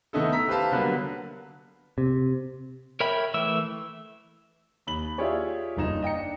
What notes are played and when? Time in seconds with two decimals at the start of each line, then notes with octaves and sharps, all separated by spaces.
0.13 D#3 A3 B3 D#4 E4 A4
0.32 A#5 E6 B6
0.48 G4 B4 C5 F5 A5
0.72 D3 F#3 G3 A#3 B3 B4
1.98 C3
3.00 A#4 C#5 E5 G5 B5
3.34 E3 A3 E5 E6
4.87 D#2 B5 F#7
5.18 E4 F4 G4 G#4 C#5 D5
5.76 F#1 G2 D#4 E7
6.03 D#5 G5 A#5 C#7
6.15 D4